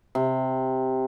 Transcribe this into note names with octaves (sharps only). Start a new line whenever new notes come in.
C3